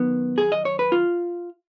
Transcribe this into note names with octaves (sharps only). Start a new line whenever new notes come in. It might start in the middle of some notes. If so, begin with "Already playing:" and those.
Already playing: F#2 D#3 B3
G#4
D#5
C#5
B4
F4